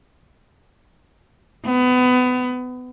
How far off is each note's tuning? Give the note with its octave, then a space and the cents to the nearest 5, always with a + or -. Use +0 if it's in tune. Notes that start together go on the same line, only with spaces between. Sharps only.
B3 +25